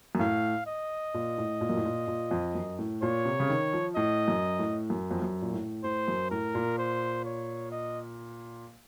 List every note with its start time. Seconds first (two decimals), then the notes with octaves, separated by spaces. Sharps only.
0.15 F#2
0.19 A2 F5
0.67 D#5
1.14 A#2
1.38 A2
1.61 A#2
1.69 F#2
1.77 A2
1.85 A#2
2.08 A#2
2.31 F2
2.55 F#2
2.79 A2
3.02 A#2 C#5
3.25 C3
3.40 C#3
3.49 D#3
3.73 F3
3.96 A2 D#5
4.28 F#2
4.59 A2
4.90 F#2
5.11 F2
5.22 F#2
5.42 A#2
5.53 A2
5.84 A2 C5
6.08 F#2
6.31 A2 A#4
6.55 A#2
6.78 C5
7.25 C#5
7.72 D#5